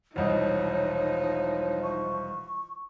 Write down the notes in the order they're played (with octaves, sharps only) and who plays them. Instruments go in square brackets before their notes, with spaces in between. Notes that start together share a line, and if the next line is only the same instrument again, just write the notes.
[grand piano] E1 C2 D#5 [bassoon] F3 [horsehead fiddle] D#4 [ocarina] C#5
[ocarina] C#6